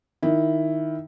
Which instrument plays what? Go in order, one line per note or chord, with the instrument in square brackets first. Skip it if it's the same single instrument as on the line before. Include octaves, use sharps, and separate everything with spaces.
[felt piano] D#3 E4